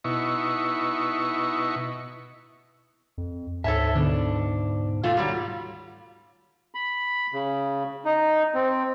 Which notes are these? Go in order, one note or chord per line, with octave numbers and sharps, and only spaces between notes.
B2 D#4 E4 C#6
F2
D2 G#2 A4 C#5 E5 A5
B2 D3 D4
A#2 A3 F4
D#3 F#3 G3
B5
C#3
D#4
C4